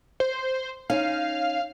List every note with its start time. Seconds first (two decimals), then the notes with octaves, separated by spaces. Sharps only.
0.20 C5
0.90 C#4 D#4 F5